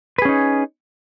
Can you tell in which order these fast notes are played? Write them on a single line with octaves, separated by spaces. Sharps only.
B4 G#4 C#4 D#4